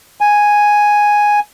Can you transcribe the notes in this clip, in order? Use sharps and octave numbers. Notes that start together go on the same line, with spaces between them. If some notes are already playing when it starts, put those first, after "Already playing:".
G#5